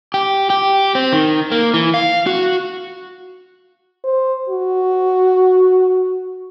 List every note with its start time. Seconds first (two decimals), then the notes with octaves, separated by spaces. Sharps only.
0.14 G4
0.50 G4
0.95 C4
1.13 D#3
1.52 A#3
1.74 E3
1.94 F5
2.26 F#4
4.04 C5
4.49 F#4